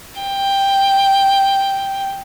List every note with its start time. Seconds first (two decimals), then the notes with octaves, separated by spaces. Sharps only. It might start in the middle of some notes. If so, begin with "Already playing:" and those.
0.21 G5